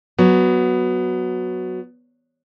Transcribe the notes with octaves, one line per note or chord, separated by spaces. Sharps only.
F#3 B3